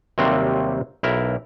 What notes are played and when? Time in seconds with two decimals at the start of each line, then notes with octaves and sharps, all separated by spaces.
0.18 D#2 C3 F#3 G3 A#3 C4
1.03 B1 E4 A#4